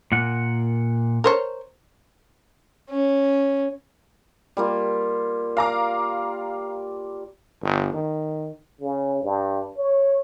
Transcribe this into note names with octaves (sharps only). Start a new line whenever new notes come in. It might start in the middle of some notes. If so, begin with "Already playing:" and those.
A#2 A#4 F#5
A#4 C5 C#5
C#4
G3 A#3 F4
D5 F5 A#5 D6
G1
D#3
C#3
G2
C#5